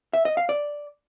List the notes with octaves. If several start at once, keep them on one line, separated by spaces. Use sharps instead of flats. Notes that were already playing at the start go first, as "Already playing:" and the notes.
E5
D#5
F5
D5